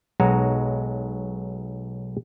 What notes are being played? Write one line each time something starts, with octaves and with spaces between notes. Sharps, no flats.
B1 F#3 G#3 D#4 F#4 A#5